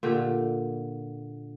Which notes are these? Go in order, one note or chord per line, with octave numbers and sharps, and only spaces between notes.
A#2 D3 G4